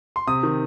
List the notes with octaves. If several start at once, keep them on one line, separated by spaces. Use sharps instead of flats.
C6
C3 D#6
D#3